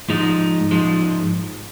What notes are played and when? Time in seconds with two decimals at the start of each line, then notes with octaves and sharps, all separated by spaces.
0.09 G#2 F3 G#3 D#4
0.71 G#2 F3 G#3